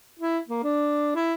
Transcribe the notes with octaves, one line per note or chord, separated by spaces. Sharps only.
E4
A#3
D4
E4